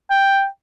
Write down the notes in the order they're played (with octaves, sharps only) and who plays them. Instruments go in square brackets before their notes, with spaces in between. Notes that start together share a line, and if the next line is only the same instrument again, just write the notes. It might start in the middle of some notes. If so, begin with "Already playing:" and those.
[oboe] G5